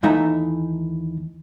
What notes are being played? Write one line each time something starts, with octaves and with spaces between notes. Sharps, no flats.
D#2 E3 A3 D#4 E5 A#5